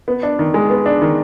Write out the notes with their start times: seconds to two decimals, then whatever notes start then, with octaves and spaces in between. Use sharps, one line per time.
0.08 B3
0.23 D4
0.39 D#3
0.54 G#3
0.70 B3
0.86 D4
1.02 D#3